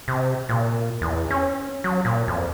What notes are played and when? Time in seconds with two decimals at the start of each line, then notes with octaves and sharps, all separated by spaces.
0.08 C3
0.49 A#2
1.01 E2
1.30 C#4
1.84 F#3
2.05 A#2
2.28 F2